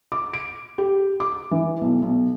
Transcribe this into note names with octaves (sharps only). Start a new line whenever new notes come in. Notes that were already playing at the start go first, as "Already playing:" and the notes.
D6
D7
G4
D6
E3
B1
B1